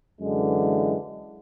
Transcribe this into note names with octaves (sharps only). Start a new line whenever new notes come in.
F#2 D3 E3 G#3